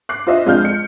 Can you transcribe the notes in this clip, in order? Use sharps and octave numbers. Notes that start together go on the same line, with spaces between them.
D6 F#6 C7
F4 C5 D#5 E5
F2 G#3 F4 D5 F6 G6
C#7